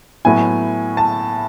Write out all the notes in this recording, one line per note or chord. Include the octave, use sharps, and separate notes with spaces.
A2 F#3 B3 E4 G#5
A5